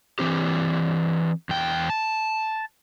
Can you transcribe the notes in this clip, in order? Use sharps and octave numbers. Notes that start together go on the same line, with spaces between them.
E3 C4 G4
E2 G5
A5